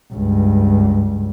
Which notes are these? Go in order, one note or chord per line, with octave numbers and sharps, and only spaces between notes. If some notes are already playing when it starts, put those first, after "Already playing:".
C#2 G2